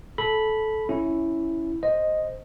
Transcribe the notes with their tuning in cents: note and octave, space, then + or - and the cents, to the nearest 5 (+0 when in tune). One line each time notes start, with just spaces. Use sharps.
A4 -15 B5 -5
C#4 +0 E4 +0
C5 +0 D#5 +0